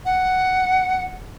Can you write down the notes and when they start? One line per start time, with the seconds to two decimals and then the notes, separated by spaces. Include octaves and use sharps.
0.05 F#5